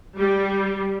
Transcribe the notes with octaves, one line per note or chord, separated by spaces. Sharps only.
G3